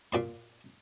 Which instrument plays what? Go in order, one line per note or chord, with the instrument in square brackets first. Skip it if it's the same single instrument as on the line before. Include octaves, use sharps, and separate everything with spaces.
[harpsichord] A#2 D5 C6